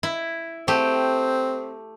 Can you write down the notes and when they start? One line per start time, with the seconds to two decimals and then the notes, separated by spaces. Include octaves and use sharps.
0.03 E4
0.68 A3 C4 G4